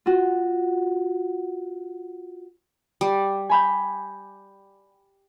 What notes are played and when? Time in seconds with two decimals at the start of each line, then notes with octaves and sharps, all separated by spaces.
0.06 F4 F#4
3.01 G3
3.49 G#5 B5 G6